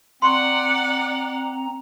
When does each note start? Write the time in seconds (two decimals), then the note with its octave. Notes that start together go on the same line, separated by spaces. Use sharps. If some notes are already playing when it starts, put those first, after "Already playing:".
0.22 C4 D5 F#5 A#5 C6 C#6